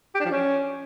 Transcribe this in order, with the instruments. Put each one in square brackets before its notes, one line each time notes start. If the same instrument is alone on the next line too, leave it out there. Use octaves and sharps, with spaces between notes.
[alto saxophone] G4
D4
F3
C#4